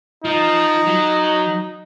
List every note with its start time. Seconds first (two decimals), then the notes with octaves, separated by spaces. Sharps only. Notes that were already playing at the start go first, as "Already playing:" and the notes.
0.25 F3 D#4
0.87 F#3